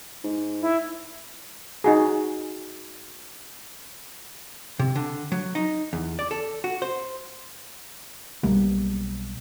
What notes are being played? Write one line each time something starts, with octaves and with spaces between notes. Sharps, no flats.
G#2
E4
D#4 F#4 G#4
C3
D3
F#3
D#4
E2
D5
A4
F#4
C5
B1 G3 A#3